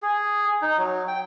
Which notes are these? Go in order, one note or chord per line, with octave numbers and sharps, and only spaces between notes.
G#4
D#4
F#3
G5